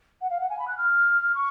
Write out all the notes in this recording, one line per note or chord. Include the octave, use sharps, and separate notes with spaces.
F#5
F5
F#5
G#5
B5
F#6
F6
C#6